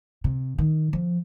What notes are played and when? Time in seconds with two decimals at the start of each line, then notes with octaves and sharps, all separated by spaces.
0.24 C3
0.58 D#3
0.93 F3